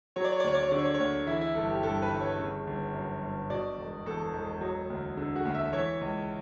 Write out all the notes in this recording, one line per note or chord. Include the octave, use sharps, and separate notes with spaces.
F#3 C#5
D5
C#5
D5
D2 C#5
D5
C#5
D3 D5
C#5
D5
C#5
D2
E3 E4
E4
G1 A4
G4
G2 A4
B4
G1
C#5
C#3
G1
F#2
G1
B2 D5
E1
E2 A4
E1
F#3
D2
D3
F#4
D2
E5
E3 C#5
C#2